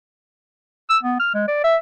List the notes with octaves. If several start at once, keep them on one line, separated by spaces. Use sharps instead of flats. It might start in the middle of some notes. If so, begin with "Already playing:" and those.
E6
B3
F6
G#3
D5
E5